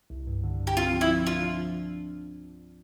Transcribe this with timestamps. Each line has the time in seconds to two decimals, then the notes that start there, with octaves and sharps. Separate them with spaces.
0.10 C2
0.27 G2
0.44 D3
0.60 G2
0.67 G4
0.77 C4 F4
0.93 F3
1.01 E4
1.10 C4
1.27 D4 F4
1.43 F3